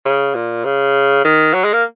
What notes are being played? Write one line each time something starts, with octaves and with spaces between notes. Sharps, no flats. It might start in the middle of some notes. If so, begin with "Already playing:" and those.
C#3
A#2
C#3
D#3
F#3
G#3
A#3